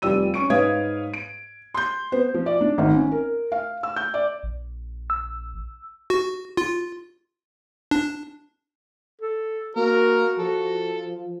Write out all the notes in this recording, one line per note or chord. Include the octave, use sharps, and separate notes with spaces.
F1 F3 G3 D5 E6 D#7
C#4 C#6 D7
G#2 B4 C#5 F5 D#6 G#6
D7
C6 G6
B3 C5
F3
D5
D4
G#1
C#4
A#4
F5
E6
G6
D5
A#1
E6
F#4
F4
D4
A4
A#3 F#4 A#4
F3 A4